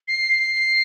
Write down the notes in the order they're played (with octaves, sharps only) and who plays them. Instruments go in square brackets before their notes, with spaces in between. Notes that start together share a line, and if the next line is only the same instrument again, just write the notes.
[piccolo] C7